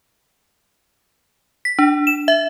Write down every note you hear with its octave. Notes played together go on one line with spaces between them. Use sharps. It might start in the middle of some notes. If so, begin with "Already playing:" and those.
B6
D4
E7
E5